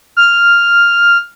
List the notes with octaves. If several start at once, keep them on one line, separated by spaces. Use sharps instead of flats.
F6